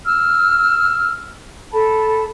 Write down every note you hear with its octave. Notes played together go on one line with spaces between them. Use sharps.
E6 F6
A4 A5 B5